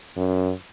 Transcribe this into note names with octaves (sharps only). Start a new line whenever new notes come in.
F#2